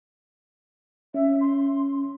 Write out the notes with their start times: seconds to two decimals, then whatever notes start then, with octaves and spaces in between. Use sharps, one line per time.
1.14 C#4 E5
1.41 C6